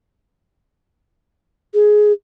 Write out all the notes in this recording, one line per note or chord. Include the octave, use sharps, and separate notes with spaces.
G#4